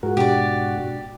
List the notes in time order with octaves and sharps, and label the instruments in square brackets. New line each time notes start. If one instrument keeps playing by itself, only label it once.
[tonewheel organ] G#2 F#4 [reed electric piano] F4 G#4 A#4
[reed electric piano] B2 D4 [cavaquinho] G4 D5